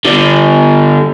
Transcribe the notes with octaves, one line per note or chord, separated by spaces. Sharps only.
D3 G3